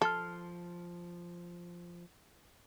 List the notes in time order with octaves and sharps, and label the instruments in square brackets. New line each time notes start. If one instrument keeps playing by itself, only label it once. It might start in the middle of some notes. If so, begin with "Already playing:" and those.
[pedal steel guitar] F3 C6 F6 [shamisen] A4